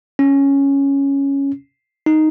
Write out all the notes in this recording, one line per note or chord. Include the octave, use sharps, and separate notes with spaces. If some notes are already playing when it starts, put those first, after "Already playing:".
C#4
D#4